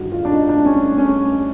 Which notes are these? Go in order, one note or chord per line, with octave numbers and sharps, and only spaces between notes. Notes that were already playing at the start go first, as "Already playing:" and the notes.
Already playing: G1 G2 D#3 F#4
F4
D4
D#4
D4
C#4
C#4